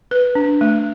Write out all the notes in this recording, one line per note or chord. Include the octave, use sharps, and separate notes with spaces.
B4
D4
A3